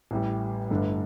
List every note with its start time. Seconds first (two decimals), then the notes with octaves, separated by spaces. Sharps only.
0.11 A1 A2 G3
0.70 G1 G2 D3 A3